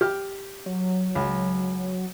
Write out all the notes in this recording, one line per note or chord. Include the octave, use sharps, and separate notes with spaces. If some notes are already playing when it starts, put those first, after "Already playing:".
G4 F6
F#3
C#2